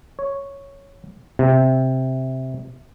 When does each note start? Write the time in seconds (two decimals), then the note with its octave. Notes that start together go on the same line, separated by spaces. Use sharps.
0.19 C#5
1.39 C3